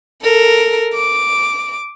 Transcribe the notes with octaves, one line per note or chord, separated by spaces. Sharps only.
A4 A#4
D6